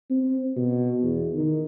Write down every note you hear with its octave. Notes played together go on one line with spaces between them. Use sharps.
C4
B2
E2
D#3